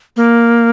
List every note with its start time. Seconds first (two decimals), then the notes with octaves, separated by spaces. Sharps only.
0.16 A#3